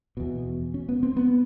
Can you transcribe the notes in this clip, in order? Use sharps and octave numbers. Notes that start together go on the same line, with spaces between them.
E2 B2
C#4
B3
C4
B3